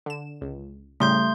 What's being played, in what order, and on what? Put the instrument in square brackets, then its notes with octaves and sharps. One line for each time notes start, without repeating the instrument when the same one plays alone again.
[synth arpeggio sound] D3 E7
C#2
[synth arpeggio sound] A2 C#3 G3 [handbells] A3 C6 G6